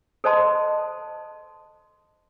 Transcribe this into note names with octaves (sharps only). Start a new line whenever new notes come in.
A4 C5 D#5 A5 C6